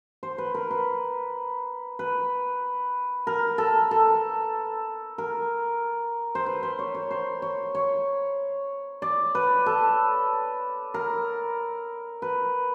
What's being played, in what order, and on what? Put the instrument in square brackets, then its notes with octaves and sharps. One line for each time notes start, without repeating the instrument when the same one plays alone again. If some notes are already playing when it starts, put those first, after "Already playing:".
[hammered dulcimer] C5
B4
A#4
B4
B4
A#4
A4
A4
A#4
C5
B4
C5
C#5
C#5
C5
C#5
C#5
D5
B4
A4
A#4
B4